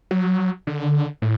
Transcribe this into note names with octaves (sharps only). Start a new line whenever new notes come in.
F#3
D3
A2